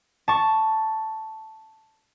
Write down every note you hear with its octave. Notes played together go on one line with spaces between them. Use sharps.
A5 C#6